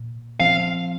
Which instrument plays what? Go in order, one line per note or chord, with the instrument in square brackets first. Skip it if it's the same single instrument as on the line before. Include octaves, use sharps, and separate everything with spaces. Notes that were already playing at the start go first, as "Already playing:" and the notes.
Already playing: [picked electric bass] A#2
[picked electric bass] F3 C4 [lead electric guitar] F5